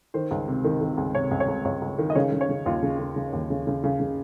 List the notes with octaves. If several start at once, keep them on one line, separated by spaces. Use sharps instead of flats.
D#3 C5
C#2
C3
D#3
D#3
C#2
C3 C#5
C#2
C#5
C#2
C#2 C#5
C#2
D#3
D#5
C#3 C#5
C#3
C#5
C#3
D#2 F4
C#3
C#3
C#3
D#2
C#3
C#3
C#3
C#3